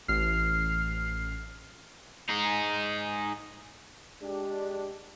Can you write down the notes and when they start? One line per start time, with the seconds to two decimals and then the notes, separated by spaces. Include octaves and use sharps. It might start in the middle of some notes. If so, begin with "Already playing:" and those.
0.08 A1 F6 C7
2.29 D#4 G#4
4.21 G#3 D4 G4